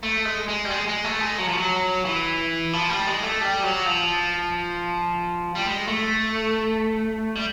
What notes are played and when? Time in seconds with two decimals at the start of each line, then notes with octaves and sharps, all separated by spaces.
0.03 A3
0.25 G#3
0.48 G#3
0.65 G3
0.70 G#3
0.88 G#3
1.04 A3
1.21 G#3
1.39 F#3
1.48 F3
1.57 F#3
2.05 E3
2.73 F3
2.90 G3
3.07 G#3
3.23 A3
3.41 G3
3.63 F#3
3.86 F3
5.55 G3
5.66 G#3
5.88 A3
7.35 G3